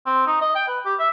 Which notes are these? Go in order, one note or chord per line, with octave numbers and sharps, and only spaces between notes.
C4
D#4
D#5
G5
B4
G4
E5